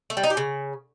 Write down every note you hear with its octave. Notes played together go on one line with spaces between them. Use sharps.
A3
G3
D#4
G4
C#3